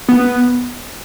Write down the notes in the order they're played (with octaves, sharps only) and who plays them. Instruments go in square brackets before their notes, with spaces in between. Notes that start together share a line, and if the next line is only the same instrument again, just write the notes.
[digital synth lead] B3